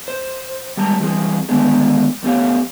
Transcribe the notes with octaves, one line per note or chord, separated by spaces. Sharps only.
C5
G3 G#3 A5 A#5
E3 G3 C4 G#4
D3 D#3 G#3 B3 D4 G#4
F2 A3 B3 C#4 G4 F5